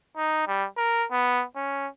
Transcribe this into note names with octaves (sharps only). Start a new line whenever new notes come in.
D#4
G3
A#4
B3
C#4